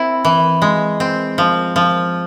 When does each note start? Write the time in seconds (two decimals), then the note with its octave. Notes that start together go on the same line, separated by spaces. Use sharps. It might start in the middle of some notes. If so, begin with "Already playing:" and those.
Already playing: C4 E4
0.25 E3
0.62 G#3
1.00 C4
1.38 F3
1.76 F3